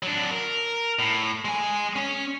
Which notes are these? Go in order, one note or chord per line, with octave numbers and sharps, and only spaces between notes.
F#3 D4
A#4
A2
G#3 G#5
C#4